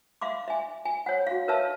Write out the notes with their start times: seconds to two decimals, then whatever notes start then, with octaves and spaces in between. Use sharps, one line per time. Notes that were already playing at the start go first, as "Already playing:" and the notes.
0.21 E5 F5 C6 D6
0.48 E5 G#5
0.85 G#5
1.06 C#5 F#5
1.27 F#4 F5
1.48 A#4 B4 C#5 E5 F5 A5